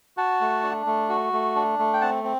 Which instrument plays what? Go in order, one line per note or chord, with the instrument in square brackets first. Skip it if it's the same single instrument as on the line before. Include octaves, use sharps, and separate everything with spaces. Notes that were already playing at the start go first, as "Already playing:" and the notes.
[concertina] F#4 F#5 A5
A3
D4
A3
F#4
A3
D4
A3
G5
C4 F#5 A5
C4